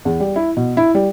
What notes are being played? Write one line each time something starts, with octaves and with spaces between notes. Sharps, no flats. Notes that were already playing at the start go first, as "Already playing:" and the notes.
E2
G3
E4
B2
E4
G3